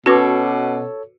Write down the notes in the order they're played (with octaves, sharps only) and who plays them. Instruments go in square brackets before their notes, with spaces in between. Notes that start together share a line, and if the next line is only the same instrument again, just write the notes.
[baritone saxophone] B2 [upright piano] C#4 D6 [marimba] F#4 B4 [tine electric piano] A4 C#5